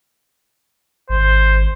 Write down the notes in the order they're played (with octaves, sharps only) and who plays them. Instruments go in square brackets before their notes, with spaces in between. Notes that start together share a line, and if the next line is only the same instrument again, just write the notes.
[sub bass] G#1 [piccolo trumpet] C5